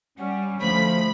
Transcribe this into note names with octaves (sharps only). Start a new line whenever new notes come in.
G3 C#4 F#5
D2 F3 A3 B5